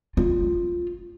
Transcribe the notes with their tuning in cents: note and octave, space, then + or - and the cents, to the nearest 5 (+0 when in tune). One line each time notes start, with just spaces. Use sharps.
F4 +0